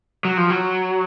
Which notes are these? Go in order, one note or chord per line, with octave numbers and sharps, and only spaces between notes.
F#3
F3
F#3